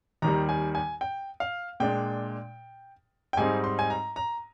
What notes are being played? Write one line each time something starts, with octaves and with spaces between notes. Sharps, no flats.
D#2 D#3 G3 A#5
G#5
G#5
G5
F5
A#2 G#3 D4 G5
G5
G#2 G3 C4 D#4 G#5
C6
G#5
A#5
A#5